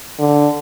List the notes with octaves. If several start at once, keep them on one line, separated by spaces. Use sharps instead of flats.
D3